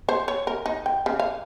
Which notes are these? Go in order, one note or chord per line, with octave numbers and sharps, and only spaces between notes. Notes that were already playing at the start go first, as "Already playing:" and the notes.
C5
C#5
A#4
D#4
G5
C#3
F5